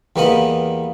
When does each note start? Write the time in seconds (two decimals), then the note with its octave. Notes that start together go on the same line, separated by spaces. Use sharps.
0.16 E2 G3 A#3 B3 D#5 B5